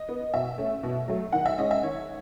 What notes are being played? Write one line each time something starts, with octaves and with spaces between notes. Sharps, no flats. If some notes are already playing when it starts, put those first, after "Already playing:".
Already playing: D#5
B3
B2 E5
A3 C#4
B2
F#3 A3
D#3 F#5
E5
G#3 C#4 D#5
E5
D#3 C#5